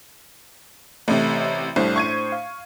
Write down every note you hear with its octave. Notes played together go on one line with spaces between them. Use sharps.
A1 C3 A3 G4
C2 A2 D4 C5
C#6 G#6 D#7
F5